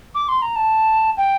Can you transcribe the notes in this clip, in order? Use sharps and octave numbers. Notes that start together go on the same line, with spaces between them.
D6
C6
A#5
A5
G5